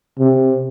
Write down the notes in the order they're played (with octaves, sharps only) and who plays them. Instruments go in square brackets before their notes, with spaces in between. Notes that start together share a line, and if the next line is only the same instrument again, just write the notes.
[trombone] C3